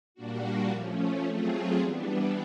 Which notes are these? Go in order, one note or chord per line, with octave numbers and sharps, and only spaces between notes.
A#2 G3 A#3 D4 F#4
F3 A3 C#4
F#3 A3 C4 F4 G#4
E3 G3 B3 D4